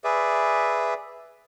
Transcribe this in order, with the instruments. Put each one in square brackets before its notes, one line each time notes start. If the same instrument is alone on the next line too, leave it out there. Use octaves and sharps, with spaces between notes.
[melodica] G#4 B4 D5 E5